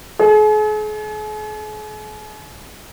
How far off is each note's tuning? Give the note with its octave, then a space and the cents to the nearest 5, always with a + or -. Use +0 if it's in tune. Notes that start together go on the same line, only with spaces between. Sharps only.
G#4 +45